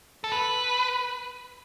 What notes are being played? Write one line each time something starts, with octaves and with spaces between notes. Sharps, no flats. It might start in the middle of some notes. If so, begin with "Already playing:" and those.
A4
B4